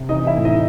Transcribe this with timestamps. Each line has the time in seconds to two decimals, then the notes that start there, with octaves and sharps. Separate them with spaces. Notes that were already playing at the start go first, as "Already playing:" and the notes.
Already playing: C3
0.09 E3 D#4 D#5
0.27 E4 E5
0.36 A2
0.45 D#4 D#5